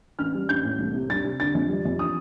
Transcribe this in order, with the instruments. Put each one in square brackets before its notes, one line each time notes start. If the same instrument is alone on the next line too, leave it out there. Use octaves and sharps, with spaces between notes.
[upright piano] A1 F6
G3
A1 G6
A2
C2
C3
G3 A6
C3
D3 A6
F2
G3
F2
D#6